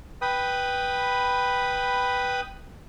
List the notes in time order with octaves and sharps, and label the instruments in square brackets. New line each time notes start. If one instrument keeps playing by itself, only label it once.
[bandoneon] B4 G5 B5 D#6